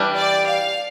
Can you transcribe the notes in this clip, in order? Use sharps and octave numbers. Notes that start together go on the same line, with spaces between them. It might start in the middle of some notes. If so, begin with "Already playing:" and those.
Already playing: E3 G3 D4
D5
F5